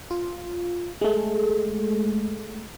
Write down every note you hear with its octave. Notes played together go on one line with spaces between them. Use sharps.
F4
G#3 A3